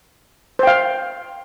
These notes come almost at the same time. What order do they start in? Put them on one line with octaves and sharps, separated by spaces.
C5 G5 F5